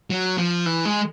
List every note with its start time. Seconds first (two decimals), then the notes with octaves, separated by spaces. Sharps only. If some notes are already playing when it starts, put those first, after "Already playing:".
0.10 F#3
0.38 F3
0.66 E3
0.85 G#3